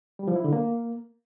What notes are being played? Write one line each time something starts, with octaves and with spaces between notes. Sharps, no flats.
G3
F3
E4
D3
A#3